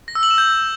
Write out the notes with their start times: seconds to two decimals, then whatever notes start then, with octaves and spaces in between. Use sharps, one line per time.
0.08 A#6
0.15 E6
0.23 F#7
0.31 E7
0.38 G6